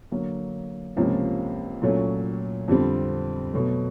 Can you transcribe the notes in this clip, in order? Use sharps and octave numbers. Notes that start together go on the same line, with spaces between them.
D3 F#3 A#3
C#2 C3 F3 A#3 C#4
A#2 F#3 A3 C#4
F2 D3 G3 C4
B2 F#3 A3